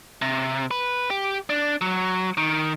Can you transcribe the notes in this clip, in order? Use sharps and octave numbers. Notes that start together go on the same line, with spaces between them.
C3
B4
G4
D4
F#3
D#3